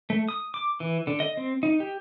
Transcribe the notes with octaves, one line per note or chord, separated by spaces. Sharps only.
A3
D#6
D6
E3
D3
D#5
C4
D#4
G4